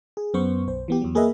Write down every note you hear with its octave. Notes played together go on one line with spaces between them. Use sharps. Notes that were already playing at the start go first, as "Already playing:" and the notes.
G#4
F#2 B3 C5 C#6
B1 C5
E3 B3 G4
E2 F#3
A#3 G#4 A#4 B4 D#5 E5